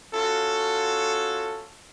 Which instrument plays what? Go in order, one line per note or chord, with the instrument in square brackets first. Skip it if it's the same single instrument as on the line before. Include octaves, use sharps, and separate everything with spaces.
[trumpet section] C#4 F4 F#4 A4